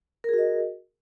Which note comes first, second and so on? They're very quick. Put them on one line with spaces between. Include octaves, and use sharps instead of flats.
A#4 G#4 F#4 D#5